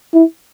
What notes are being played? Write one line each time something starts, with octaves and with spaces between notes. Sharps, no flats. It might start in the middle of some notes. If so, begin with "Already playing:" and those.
E4